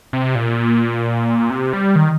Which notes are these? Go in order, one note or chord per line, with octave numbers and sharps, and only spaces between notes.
C3
A#2
C3
G3
D#3